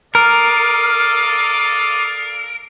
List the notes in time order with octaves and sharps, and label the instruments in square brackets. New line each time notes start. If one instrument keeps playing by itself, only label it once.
[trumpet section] A4 D5 F5 [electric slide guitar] A#4 [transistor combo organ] D6 D#6